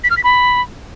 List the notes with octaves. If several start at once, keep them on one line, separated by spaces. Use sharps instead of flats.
B6
F6
B6
B5